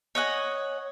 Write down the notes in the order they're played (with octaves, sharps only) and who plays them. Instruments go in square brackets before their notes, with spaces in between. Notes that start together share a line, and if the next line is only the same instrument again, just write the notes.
[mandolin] C#5 D#5 F#5 G#5